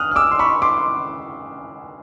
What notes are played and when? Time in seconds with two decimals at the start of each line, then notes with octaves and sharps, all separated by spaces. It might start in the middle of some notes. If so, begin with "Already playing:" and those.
Already playing: D#6 F6 F#6
0.11 F6
0.16 D6 E6
0.31 C6
0.39 B5 C#6
0.62 C6 D6